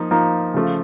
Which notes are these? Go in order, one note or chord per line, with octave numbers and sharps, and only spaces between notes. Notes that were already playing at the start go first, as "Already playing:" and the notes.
Already playing: F3 A#3 D#4
F3 A#3 D#4
C#3 F3 A3